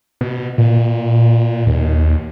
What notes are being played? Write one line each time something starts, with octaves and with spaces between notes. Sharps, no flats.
B2
A#2
D#2